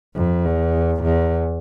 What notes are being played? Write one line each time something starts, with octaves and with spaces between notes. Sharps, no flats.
F2
E2
E2